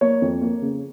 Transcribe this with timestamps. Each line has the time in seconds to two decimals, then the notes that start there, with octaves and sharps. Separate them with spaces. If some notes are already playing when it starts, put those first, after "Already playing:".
0.01 A#3 C#5
0.22 F2
0.42 A#3
0.61 C#3